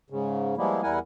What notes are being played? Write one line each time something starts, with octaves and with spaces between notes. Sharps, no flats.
G#2 C#3
F3 G3 G#3 A#3 B3 E4
E2 G3 E4 A#4 F#5 G#5